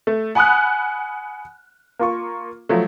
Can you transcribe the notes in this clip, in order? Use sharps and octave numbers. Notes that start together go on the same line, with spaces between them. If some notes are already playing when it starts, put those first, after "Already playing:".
A3
F#5 G#5 B5 D#6 F6 F#6
A#3 F4 C#6
F3 F#3 A3